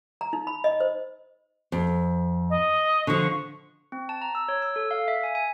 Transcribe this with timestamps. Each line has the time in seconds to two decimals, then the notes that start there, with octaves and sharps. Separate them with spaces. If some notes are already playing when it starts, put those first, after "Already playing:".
0.21 A#5
0.33 D#4
0.47 B5
0.64 D#5
0.80 C5
1.72 F2
2.50 D#5
3.07 D3 F3 C#6
3.92 C4
4.09 A5
4.22 A#5
4.35 E6
4.48 C#5
4.62 E6
4.76 A4
4.91 F5
5.08 E5
5.24 G#5
5.35 G#5